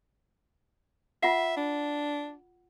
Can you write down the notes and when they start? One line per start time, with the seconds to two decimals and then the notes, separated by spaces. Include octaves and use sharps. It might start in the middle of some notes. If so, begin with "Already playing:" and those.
1.23 F4 E5 F#5
1.57 D4